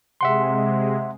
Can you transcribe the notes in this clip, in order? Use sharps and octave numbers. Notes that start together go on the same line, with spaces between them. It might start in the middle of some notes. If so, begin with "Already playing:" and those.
C3 G#3 E5 F#5 C6